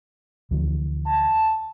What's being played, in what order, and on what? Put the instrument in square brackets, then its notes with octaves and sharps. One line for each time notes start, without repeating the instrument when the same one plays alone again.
[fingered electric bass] D2 E3 F3
[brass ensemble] A5